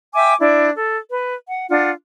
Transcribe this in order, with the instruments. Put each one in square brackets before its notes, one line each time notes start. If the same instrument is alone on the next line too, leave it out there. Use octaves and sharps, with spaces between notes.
[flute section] E5 G5 G#5 D6
D4 E4 D5
A4
B4
F#5
D4 F4 F#5